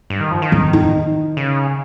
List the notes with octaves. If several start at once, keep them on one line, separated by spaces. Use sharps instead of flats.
G2
D#3
F3
D#3
F3
D#4
C#3